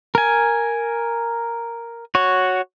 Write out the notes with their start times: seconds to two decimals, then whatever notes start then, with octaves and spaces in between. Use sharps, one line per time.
0.15 A#4 G#5
2.15 F#4 C#5